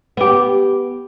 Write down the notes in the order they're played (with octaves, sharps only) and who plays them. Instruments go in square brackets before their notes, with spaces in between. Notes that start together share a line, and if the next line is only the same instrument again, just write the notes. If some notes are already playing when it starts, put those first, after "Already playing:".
[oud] B3 G4